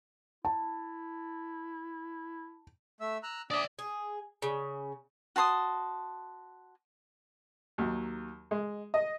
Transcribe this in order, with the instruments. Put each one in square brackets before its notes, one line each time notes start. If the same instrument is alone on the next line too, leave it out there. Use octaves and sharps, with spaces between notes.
[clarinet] E4 [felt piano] A5
[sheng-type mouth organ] A3 E5 E6
A#5 E6 F#6
[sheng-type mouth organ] D4 [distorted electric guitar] D5 E5 [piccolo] D#6
[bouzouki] G#4
C#3
[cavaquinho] F#4 A5 C6 D#6
[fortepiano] D#2 F#3
G#3
D#5